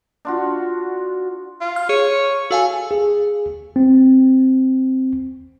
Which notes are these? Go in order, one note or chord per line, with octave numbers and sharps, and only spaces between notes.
D4 F4 F#4
F4
F6
G#4 C#5
F#4 A4 F5 G#5
G#4
C4